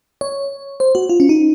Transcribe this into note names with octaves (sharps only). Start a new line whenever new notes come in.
C#5
C5
F#4
F4
C#4
D#4